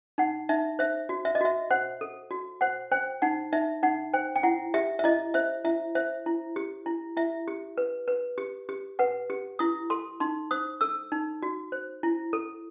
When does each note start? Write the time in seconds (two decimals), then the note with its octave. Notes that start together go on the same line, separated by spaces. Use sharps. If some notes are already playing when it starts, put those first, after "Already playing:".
0.18 D#4 F#5
0.49 D#4 E5
0.79 C5 E5
1.09 F#4
1.25 E5
1.35 D#5
1.41 F#4 E5
1.71 C5 F#5
2.01 A4
2.31 F#4
2.61 C5 F#5
2.92 C5 G5
3.22 D#4 F#5
3.52 D#4 E5
3.83 D#4 F#5
4.14 C5 G5
4.36 G5
4.43 E4 F#5
4.74 G4 E5
4.99 E5
5.04 E4 D#5
5.34 C5 E5
5.64 E4 E5
5.95 C5 E5
6.26 E4
6.56 G4
6.86 E4
7.17 E4 E5
7.48 G4
7.78 B4
8.08 B4
8.38 G4
8.69 G4
8.99 B4 F#5
9.30 G4
9.59 E4 D#6
9.90 A4 C6
10.20 D#4 C6
10.51 C5 D#6
10.81 A4 E6
11.12 D#4
11.43 F#4
11.72 C5
12.03 E4
12.33 A4